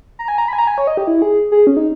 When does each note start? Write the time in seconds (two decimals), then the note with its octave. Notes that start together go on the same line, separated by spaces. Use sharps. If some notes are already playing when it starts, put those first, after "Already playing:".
0.19 A#5
0.28 G#5
0.38 A#5
0.48 B5
0.53 G#5
0.58 A#5
0.67 G#5
0.78 C#5
0.87 D#5
0.97 G4
1.07 E4
1.22 G#4
1.52 G#4
1.67 C#4
1.77 D#4